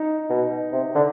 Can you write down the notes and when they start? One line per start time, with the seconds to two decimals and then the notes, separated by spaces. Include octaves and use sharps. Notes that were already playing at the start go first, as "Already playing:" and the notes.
Already playing: D#4
0.30 B2
0.72 C3
0.95 D3